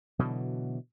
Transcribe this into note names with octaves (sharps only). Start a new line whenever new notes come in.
B2 D3 E3 F#3